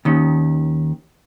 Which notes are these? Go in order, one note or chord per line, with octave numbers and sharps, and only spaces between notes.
D#2 D#3 C#4